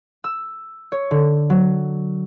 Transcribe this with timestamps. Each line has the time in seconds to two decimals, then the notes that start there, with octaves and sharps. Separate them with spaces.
0.24 E6
0.92 C#5
1.11 D3
1.50 F#3